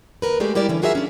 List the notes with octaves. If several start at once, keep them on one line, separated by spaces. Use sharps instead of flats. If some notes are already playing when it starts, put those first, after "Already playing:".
D#2 C#3 A#4 B4
G#3 A3 G4 D5
G3 E4 G4 A#4 D5
D3 E3 C#4
F4 F#4 G#4 A#4 D#5 E5
C#4 D4